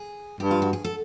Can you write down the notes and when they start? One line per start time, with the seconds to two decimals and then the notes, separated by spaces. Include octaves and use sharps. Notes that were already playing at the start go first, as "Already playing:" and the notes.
Already playing: G#4
0.40 G2 G4
0.51 F4
0.62 F#4
0.73 G#4
0.84 A4